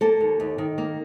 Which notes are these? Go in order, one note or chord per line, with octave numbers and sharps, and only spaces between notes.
A#3 A4 A5
D#2
D#2
D#3
A#3